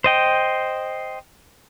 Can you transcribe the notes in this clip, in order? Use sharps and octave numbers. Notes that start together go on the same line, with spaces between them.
C5 D#5 G5